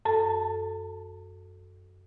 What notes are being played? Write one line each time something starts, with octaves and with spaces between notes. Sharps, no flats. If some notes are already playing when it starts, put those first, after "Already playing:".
F#2 A4 A5